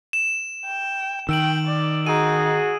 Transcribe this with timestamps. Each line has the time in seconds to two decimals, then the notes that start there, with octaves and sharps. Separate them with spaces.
0.13 E7
0.65 G5
1.29 D#3 G5 E6 D7 F#7
1.67 D5
2.06 D#4 F#4 G#4 D#7